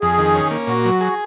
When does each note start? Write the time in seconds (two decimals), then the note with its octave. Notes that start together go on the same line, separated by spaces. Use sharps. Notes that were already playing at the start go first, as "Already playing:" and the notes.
0.01 F2 G#4
0.19 D#3
0.35 C#4
0.51 A#3
0.67 A#2 F#4
0.85 F#3
1.01 G#4